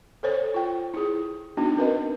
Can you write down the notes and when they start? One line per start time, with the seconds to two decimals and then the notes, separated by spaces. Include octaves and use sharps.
0.23 A4 C5 C#5
0.54 F4 G5
0.94 E4 G#4
1.57 B3 D4 D#4 F#4
1.77 C4 A#4 B4 D#5